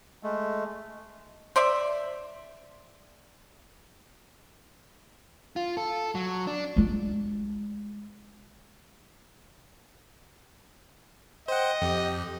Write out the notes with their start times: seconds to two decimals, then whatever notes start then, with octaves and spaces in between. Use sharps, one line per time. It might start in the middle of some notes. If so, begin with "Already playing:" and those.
0.23 G#3 A3
1.56 C5 D5 E5
5.56 F4
5.77 A4
6.15 F#3
6.47 D4
6.76 G#3 F4
11.48 C5 D#5 F#5 G5
11.82 F2 G4